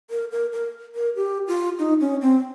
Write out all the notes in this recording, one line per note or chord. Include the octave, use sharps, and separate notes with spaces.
A#4
A#4
A#4
A#4
G4
F4
D#4
C#4
C4